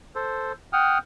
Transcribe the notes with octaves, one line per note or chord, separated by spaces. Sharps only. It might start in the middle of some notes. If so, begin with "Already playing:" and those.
A4 C5
F#5 G5 D#6 F6